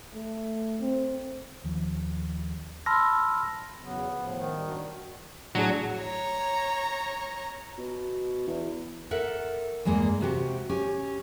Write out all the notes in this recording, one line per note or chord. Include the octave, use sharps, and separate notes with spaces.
A3
C4
D#2 D#3 F3
A5 B5 C6 E6 F6 A#6
E2 C#3 F#3 B3
A2 F3
D#3
G3
F#2 D4 F#4
A2 F#3 D4 G#4
C#5 A#5
B2
E2
A4 A#4 E5 F#5
E2 G2 G#3 A#3
C3 F#4 G4
C#4 G4